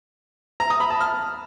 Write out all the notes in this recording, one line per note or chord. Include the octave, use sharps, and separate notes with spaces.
A#5
D#6
B5
A5
F6